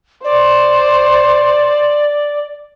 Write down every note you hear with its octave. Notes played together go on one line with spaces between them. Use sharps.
C5 D5